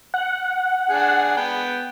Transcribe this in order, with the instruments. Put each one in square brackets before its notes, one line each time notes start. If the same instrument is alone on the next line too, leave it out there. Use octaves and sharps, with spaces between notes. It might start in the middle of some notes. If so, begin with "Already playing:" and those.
[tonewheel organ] F#5
[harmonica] D4 G#4
B3 G5